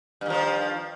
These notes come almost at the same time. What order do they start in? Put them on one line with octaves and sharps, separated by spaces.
G2 D#3 F3